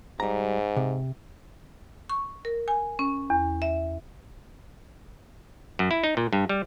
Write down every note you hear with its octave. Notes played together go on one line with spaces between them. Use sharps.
G#2 G3 A#5
C3
C#6
A#4
G#5
C#4
E2
E5
F#2
E4
D#4
A#2
G2
G3